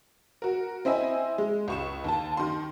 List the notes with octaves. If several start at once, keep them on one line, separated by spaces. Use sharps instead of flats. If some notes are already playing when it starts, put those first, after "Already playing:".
F#4 A#4
C4 E4 D#5 E5 G#5
G#3
C#2 C#6 E7
D#2 A5
D#3 C6